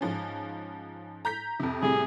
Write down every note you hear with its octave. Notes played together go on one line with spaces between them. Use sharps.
G#2 F3 C#4
A#5 G6 B6
F2 C3
A2 C3 G3 G#4